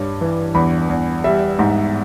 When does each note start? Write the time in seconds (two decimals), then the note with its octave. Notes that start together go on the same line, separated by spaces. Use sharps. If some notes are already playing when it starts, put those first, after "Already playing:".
Already playing: G2 G3 C#5
0.21 E3
0.55 E2 B5
0.90 E2
1.24 G3 E5
1.59 G#2